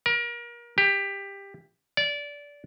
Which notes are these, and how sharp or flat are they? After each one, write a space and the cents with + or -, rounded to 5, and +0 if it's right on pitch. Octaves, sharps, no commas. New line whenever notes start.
A#4 +30
G4 +15
D5 -20